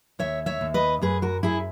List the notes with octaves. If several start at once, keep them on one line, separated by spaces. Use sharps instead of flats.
D#2 C#5 E5
C#5 E5
D#2
B4 D#5
F#2 G#4 B4
F#4 A#4
F#2 E4 G#4